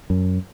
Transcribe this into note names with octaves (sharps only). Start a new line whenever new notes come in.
F#2